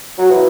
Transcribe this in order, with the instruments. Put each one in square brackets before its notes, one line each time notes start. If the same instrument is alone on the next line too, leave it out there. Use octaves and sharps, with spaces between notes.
[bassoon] F#3
E3